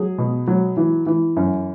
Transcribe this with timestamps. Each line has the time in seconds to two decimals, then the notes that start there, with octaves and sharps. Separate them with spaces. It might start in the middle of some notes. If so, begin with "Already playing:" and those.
Already playing: F#3 G#4
0.18 B2
0.48 F#3
0.77 E3
1.06 E3
1.37 F#2